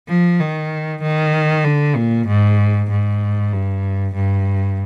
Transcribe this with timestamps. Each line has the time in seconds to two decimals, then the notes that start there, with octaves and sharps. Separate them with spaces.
0.08 F3
0.40 D#3
1.02 D#3
1.64 D3
1.96 A#2
2.27 G#2
2.90 G#2
3.53 G2
4.15 G2